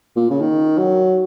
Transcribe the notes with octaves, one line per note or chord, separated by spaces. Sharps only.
A#2
C#3
D#3
F#3